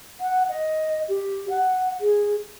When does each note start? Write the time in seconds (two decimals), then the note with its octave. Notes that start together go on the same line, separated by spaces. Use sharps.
0.20 F#5
0.49 D#5
1.09 G4
1.50 F#5
2.00 G#4